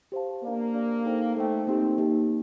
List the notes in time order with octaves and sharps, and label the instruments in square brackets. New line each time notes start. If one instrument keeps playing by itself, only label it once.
[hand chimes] G4 C5 F5 A5
[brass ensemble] A#3 [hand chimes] D4 G4 D5
[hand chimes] D4 G4 D5
D#4 A4 C5 G5
[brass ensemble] A3 [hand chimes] D#4 A4 C5 G5
[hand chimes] A#3 D#4 G4 [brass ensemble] C4
[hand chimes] A#3 D#4 G4